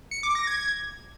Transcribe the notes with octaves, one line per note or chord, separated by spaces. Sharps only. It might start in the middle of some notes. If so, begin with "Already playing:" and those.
C#7
D6
A#6
G#6